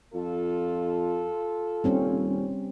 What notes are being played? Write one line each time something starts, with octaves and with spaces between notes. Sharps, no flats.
F2 F4 A4
D#1 G3 C4 C#4